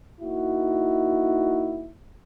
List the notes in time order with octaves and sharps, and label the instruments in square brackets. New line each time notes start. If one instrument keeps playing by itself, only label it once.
[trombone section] A#3 D#4 E4 F#4